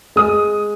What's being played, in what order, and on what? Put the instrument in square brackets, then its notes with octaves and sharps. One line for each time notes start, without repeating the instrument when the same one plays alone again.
[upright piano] G#3 D#6